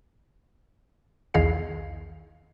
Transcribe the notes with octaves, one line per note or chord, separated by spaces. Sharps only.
B1 E2 D#3 G#4 F5 C7